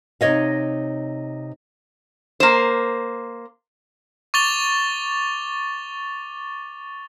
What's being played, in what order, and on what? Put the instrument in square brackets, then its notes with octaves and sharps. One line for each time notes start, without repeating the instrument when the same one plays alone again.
[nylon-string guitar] C3 D#4 C#5 D#5 F5
[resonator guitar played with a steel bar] A#3 C5
[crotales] C#6 D6 A6 F7 G7